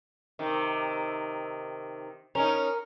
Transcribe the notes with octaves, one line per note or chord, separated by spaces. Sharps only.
C3 D#3
C#4 D#4 A#4